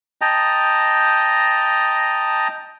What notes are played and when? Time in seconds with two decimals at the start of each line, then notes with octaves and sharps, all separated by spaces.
0.21 D#5 G5 A5 A#5